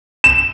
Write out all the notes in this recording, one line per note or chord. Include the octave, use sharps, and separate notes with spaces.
E7